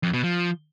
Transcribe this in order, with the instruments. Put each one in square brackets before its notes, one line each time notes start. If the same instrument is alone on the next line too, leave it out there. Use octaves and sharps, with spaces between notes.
[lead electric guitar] F2
B2
F3